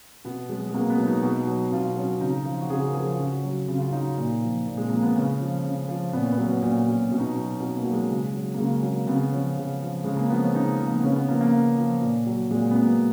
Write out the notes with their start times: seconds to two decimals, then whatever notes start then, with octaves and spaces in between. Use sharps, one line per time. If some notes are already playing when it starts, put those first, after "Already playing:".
0.25 B2 B3
0.49 F#3 G#3
0.69 G#3
0.74 B2 A#3
0.90 B3
0.98 F#3
1.07 D#4
1.23 B2
1.47 F#3
1.71 B2 F4
1.96 F#3 C#4
2.21 C#3 D#4
2.45 F3 F4
2.61 F#4
2.70 C#3 G#4
2.87 A#4
2.94 F3 G#4
3.12 F4
3.19 C#3 F#4
3.43 F#3
3.68 C#3 F4
3.80 F4
3.93 F#3 D#4
4.17 A#2
4.41 F3
4.67 A#2
4.77 G#3
4.90 F3 A#3
5.03 B3
5.15 C#3 C#4
5.39 F3
5.64 C#3
5.89 F3
6.13 A#2 B3
6.23 C#4
6.32 B3
6.38 F#3 C#4
6.51 B3
6.62 A#2 C#4
6.87 F#3
7.11 B2 C#4
7.20 D#4
7.28 C#4
7.36 F#3
7.60 B2
7.76 A#3
7.85 F#3
7.93 G#3
8.09 C#3
8.33 F#3
8.54 A#3
8.58 C#3 G#3
8.83 F#3 A#3
9.07 C#3 B3
9.32 F3 C#4
9.57 C#3
9.82 F3
10.04 C#3 G#3
10.17 A#3
10.29 F3 B3
10.42 C#4
10.54 C#3 D#4
10.79 F3
10.87 A#3
10.96 B3
11.03 C#3 C#4
11.16 B3
11.28 F3 A#3
11.41 A#3
11.53 C#3
11.77 F3
12.01 A#2
12.27 F#3
12.51 A#2 G#3
12.71 B3
12.75 F#3 A#3